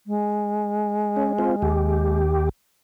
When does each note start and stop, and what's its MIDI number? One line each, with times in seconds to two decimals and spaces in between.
0.07 2.20 56
1.16 1.33 61
1.39 1.56 60
1.39 1.56 65
1.62 2.49 39
1.62 2.49 67